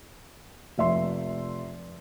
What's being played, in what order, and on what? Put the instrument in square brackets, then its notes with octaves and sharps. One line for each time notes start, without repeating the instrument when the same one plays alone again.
[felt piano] F1 E5 C6